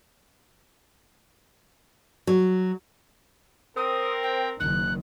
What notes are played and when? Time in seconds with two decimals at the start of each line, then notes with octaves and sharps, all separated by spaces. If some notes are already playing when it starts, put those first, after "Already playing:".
2.27 F#3
3.77 C4 A#4 D#6
4.23 G5
4.60 F#1 D#3 F#6